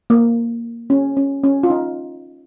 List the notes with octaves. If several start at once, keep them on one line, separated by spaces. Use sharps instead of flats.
A#3
C#4
C#4
C#4
F4
D#4